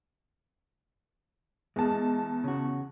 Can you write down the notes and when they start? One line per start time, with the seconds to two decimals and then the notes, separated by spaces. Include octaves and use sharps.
1.76 E2 G#3 A5
2.44 C#3 F#4